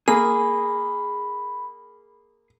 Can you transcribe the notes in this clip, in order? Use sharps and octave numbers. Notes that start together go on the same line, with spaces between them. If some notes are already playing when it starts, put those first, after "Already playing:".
A#3 G#4 B5